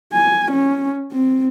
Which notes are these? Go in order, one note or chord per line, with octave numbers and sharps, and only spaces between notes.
G#5
C#4
C4